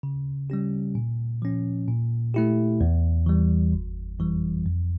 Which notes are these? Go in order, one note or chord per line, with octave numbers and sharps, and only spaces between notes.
C#3
G3 C#4 G4
A#2
F3 C#4
A#2
A3 E4 G4
E2
E3 G3
G1
F2 E3 G3
F2